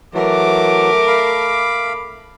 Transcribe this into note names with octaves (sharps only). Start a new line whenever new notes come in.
E3 F#3 A3 A#4 D6
F5 B5